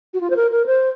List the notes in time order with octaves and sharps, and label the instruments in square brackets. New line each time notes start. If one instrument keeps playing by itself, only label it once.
[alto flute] F#4
F4
C5
A#4
A#4
C5